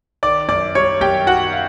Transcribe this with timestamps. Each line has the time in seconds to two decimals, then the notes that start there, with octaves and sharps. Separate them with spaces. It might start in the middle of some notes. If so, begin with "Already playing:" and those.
0.23 D#3 D5 D6
0.48 F#2 D5 D6
0.75 G3 C#5 C#6
1.01 F#2 G4 G5
1.27 D#3 F#4 F#5
1.53 F5